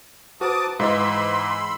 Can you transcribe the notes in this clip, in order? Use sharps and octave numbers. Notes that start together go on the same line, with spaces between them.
F#4 B4 C5 A5 A#5 D6 D#6
G#2 E3 B4 D#5 F5 B5 C6 E6